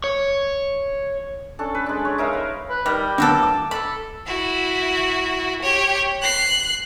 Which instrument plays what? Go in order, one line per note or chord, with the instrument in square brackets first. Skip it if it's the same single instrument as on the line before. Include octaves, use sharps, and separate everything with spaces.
[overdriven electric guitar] C#5
[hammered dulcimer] C#4 D4 A4
B4
G#3 D4
C#5
D#4 A#4 E5 F5
B4
[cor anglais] B4
[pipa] D#3 [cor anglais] G3
[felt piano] D3 B3 [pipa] F#3 A#3 A4
[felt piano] D6
[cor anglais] A4 [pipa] B5
[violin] E4 F#4
G4 C#5
F#6 C7